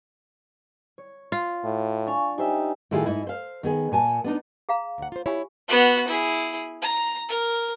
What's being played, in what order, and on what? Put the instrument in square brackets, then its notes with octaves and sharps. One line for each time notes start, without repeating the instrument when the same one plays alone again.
[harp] C#5
[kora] F4
[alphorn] A2
[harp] D4 [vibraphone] F5 G#5 C#6
[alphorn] D#4 [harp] G4 C5 E5 [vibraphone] G#5
[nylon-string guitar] A2 D#3 E4 F4 G4 G#4
G#2 D#4 E4
C5 F5
D#3 B3 G#4
A#2 G#5 A5
B3 D4 D#4
[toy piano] G#4 F5 A#5
[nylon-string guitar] D2 F#5
F4 C5
[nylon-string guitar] E4 C#5 [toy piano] F4 G4 G#5
[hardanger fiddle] B3 F#4
E4 G#4
A#5
A#4